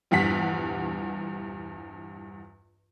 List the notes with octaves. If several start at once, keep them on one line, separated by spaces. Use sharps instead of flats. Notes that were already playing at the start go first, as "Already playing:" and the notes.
A#1 E2 G2 F#5 B6